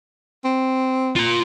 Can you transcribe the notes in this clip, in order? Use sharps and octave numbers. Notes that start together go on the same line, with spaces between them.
C4
F4 A#5